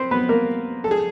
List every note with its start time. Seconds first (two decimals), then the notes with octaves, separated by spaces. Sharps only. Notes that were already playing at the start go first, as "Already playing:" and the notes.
Already playing: C4 B4 C5
0.11 B3 B4
0.29 A#3 A#4
0.84 A4
0.91 G#4